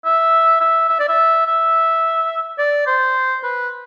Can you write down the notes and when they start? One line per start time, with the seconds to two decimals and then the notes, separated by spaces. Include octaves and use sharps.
0.05 E5
0.61 E5
0.89 E5
1.00 D5
1.09 E5
1.46 E5
2.59 D5
2.87 C5
3.44 B4